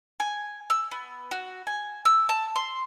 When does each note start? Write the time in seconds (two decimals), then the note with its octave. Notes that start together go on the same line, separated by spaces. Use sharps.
0.20 G#5
0.70 E6
0.91 B3
1.31 F#4
1.67 G#5
2.05 E6
2.29 A5
2.56 C6